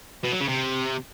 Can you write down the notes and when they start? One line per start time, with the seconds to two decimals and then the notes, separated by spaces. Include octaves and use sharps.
0.24 B2
0.32 F#3
0.40 C#3
0.48 C3